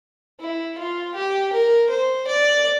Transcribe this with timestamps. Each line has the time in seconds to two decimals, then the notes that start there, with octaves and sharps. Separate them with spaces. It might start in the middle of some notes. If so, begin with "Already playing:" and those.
0.40 E4
0.78 F4
1.14 G4
1.52 A#4
1.89 C5
2.27 D5